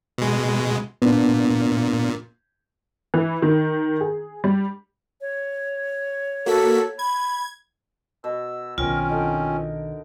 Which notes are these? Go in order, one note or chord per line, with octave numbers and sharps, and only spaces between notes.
B2 G#3
A#2 B3 D4
E3
D#3
G#4
G3
C#5
A#3 F#4 A4 B6
B5 G#6
B2 E6
B1 D#3 C4 C#4 F4 A#4
D3 D#4